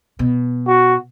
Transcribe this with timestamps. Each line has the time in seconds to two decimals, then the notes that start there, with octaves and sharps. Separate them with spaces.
0.19 B2
0.68 F#4